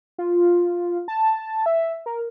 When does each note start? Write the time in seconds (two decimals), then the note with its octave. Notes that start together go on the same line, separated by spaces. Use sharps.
0.18 F4
1.08 A5
1.66 E5
2.06 A#4